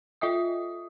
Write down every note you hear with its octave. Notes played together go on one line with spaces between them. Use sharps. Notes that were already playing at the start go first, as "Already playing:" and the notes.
F4 D#5 E5 D#6